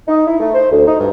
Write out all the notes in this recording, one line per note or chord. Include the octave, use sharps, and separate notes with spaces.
D#4
E4
A3
C5
D2
D#4
G2